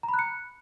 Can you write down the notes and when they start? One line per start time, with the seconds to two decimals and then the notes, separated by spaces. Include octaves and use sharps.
0.03 A#5
0.08 B5
0.14 F#6
0.19 C#7